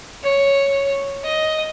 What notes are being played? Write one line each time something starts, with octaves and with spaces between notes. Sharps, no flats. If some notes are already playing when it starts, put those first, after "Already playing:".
C#5
D#5